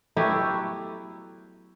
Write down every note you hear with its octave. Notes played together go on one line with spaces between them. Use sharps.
F#3 A3 B3 E4 F#4 G4